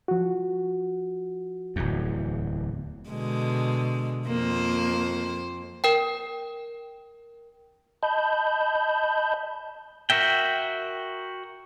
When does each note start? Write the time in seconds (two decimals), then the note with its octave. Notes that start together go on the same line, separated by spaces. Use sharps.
0.08 F3 F#4
1.76 D1 E2
3.10 B2 D3 G#3
4.27 F2 A#3 C5
5.84 A#4 G5
8.03 D#5 A5 B5 G6
10.10 F#4 A#4 E5 G5